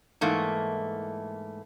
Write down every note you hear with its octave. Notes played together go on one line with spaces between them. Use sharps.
G#2 E3 A3 A#3